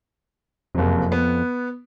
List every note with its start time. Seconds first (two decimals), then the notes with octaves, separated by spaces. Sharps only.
0.75 F#1 F2 C3
1.12 B3